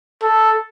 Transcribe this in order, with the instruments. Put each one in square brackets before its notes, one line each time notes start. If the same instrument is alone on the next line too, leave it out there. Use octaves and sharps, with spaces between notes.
[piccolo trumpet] A4